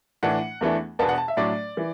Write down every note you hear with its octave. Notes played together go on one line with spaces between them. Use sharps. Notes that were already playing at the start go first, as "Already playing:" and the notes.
A2 E3 D4 F#5
E2 E3 A3 D4
E2 B2 B3 D4 A5
F#5
A5
E5
A2 F#3 A3 D4 D5
E3